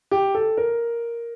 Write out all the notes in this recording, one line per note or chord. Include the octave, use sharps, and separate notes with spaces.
G4
A4
A#4